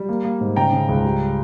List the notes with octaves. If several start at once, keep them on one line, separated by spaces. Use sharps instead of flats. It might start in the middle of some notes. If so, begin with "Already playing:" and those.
Already playing: G3
A#3
A#3
G#2
C#3 G5 A#5
C#3
C#2
G3